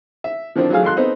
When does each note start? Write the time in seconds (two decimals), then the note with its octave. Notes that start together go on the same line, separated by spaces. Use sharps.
0.24 E5
0.56 D3 D#3 F3 C4 D4
0.70 F#3 A3 F4 G#4 F5
0.83 G#1 A4 F5 C6 F#6
0.97 B3 C4 D#4 A4 C5